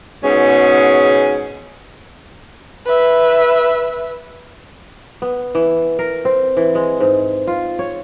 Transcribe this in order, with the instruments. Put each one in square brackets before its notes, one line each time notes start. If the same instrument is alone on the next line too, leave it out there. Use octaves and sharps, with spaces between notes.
[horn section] G#2 B2 C#4 G#4
[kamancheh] B4 E5
[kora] B3
E3
A#4
C4
E3
G#3
G#2
F4
C#5